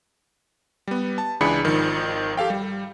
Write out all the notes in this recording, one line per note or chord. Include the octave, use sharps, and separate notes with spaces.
G3 B3
A5
C#2 E3 D4 G#4 B5 C#7
G#1 D#3 F3
G4 A4 F5 G5
G3